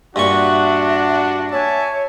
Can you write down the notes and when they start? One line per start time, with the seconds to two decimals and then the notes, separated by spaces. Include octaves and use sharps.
0.16 G2 A#2 D4 F#4 E5 C#6
1.52 C#5 E5 G#5 A5